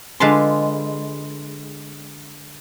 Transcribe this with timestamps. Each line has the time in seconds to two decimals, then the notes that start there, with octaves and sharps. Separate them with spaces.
0.20 D3 G#3 F4 B4 A5 C6